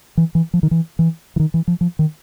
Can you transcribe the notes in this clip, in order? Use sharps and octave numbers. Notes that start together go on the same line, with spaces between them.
E3
E3
F3
D#3
E3
E3
E3
D#3
E3
F3
F3
D#3